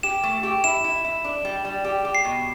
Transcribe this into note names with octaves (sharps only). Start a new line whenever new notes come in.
G4 E7
A3
G4
E4 E7
E4
E4
D4
G3
G3
G4
G4
C7
B2